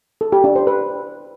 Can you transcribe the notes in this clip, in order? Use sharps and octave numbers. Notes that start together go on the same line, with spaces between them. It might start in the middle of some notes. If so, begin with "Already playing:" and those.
A4
G4
D4
C5
B4